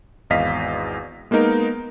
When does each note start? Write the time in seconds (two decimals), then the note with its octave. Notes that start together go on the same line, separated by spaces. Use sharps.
0.30 G#1 E2 D#5 F5 B6
1.31 G#3 A#3 B3 D#4 A#4